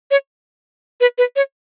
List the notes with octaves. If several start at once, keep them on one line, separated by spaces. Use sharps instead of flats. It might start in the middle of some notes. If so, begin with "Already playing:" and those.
C#5
B4
B4
C#5